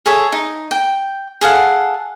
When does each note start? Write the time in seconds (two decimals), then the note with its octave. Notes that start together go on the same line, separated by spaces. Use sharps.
0.06 G#4 A4 C#5 E5
0.32 D#4
0.71 G5
1.41 G#4 A4 F5 F#5